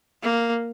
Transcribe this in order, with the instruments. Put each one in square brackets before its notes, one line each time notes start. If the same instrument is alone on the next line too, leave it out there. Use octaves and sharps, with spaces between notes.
[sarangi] A#3